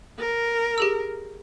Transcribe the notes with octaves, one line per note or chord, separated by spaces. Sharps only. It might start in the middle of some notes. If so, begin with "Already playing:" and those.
A#4
G4 G#4 E6